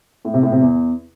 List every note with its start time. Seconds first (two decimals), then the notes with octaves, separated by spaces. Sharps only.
0.25 A2
0.34 C3
0.43 A2
0.52 C3
0.61 E2